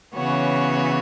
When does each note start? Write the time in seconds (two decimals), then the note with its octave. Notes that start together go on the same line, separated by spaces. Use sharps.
0.14 C#3 E3 B3 F#4 C#5